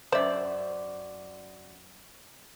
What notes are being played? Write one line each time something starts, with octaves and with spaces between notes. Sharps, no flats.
F#2 C5 D5 E5